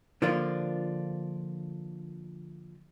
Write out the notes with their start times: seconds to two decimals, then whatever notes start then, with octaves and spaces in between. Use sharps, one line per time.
0.22 D3 F3 A#3 D4 F4